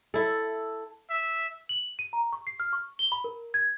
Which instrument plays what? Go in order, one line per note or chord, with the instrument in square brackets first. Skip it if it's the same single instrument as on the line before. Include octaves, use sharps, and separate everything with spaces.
[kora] E4 A4
[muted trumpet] E5
[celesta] F#7
D#7
A#5
C#6
C7
F6
C#6
G7
B5
A#4
G#6